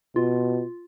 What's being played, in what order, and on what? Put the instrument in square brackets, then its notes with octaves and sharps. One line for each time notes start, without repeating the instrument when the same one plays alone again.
[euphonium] B2 [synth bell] F4